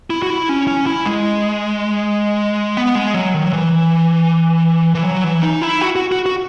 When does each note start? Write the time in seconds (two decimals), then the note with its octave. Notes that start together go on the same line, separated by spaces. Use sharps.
0.10 E4
0.23 F#4
0.30 E4
0.49 C#4
0.68 C#4
0.87 E4
1.06 G#3
2.77 B3
2.95 G#3
3.14 F#3
3.34 D#3
3.46 F#3
3.53 E3
4.95 E3
5.04 F#3
5.24 E3
5.43 D#4
5.62 E4
5.81 F#4
5.96 F#4
6.12 F#4
6.26 F#4